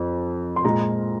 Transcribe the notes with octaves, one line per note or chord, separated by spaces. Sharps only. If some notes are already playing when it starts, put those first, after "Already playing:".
Already playing: F2
C6
A#2 G#3 A#5